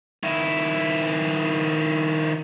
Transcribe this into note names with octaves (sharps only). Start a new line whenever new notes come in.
D#3 E4